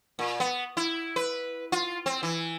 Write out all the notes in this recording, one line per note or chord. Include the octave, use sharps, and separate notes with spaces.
A#2
B3
E4
B4
F4
C4
E3